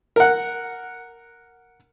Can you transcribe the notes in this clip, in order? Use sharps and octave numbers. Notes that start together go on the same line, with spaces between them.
A#4 F#5